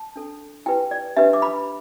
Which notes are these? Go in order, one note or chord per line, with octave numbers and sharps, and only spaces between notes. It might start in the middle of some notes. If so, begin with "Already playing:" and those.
Already playing: A5
D4 A4
E4 G4 B4 G5
D5
D4 G4 B4 E5
D6
B5